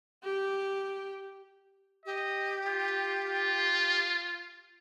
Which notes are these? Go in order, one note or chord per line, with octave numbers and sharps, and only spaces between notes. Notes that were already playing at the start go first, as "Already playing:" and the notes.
G4
G4 D#5
F4
F4